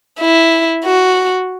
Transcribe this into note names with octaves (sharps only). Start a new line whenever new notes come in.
E4
F#4